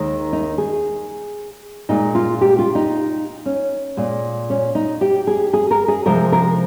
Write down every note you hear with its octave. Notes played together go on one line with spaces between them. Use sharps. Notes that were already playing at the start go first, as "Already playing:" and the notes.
Already playing: D#2 D#3 G#3
D#4
G#4
A#2 G#3 D#4
F4
G4
F4
D#4
C#4
A#2 G#3
C#4
D#4
G4
G#4
G#4
A#4
G#4
C3 F3 G#3 A#4
A#4